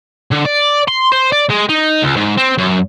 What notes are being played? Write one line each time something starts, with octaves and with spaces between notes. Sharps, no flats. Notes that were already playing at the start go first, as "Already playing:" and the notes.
D3
D5
C6
C5
D5
G#3
D#4
C#2
G#2
C4
F#2